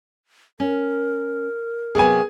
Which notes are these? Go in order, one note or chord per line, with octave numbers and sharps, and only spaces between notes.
C#4 A#4
C3 F#3 B3 G#4 G#5